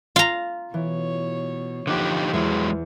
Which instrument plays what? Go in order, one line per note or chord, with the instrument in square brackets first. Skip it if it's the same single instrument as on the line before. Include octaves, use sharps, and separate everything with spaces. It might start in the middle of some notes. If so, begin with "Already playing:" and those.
[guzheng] F4 A#5
[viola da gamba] B2 C#5 [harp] E3
[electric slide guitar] D3 D#4 G4 [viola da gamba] F3 [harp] D6 F#6
[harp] E2 E4 E5 [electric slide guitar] F#3 G#3